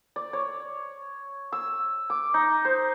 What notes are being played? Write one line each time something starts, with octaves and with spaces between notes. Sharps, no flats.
D5
C#5
E6
D6
D#4
C5